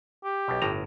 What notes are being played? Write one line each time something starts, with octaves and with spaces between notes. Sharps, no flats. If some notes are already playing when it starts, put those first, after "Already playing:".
G4
B1 B2
G1 A2 A#5